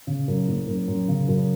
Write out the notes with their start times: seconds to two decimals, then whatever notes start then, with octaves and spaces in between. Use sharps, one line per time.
0.07 C#3
0.28 F#2
0.48 F#1
0.67 F#2
0.88 F#2
1.08 C#3
1.28 F#2